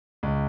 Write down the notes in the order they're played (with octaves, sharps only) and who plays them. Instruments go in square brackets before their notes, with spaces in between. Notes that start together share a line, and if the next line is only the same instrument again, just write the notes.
[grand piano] C#2